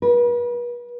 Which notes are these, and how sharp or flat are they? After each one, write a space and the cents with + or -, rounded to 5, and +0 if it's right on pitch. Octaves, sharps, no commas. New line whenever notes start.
B4 -40